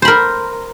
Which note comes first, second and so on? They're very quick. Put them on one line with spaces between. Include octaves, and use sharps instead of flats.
C5 B5 A#4